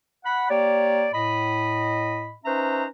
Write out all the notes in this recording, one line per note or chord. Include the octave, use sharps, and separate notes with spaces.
F#5 B5
A#3 G4 C#5 D5
A2 D#5 B5
C#4 D#4 B4 C5 E5 A#5